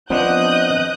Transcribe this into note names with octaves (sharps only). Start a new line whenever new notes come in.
F3 B3 C4 D4 D#5 D#6 F#6 G6